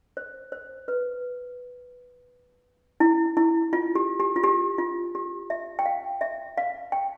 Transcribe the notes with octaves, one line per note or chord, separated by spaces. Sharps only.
C5
C5
B4
E4
E4
F4
G4
G4
F4
G4
F4
G4
E5
G5
F5
E5
F5
G5